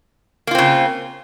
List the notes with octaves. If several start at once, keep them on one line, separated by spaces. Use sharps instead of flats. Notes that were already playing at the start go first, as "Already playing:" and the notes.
C#3 A#3 C4 F4